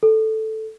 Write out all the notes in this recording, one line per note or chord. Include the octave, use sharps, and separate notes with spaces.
A4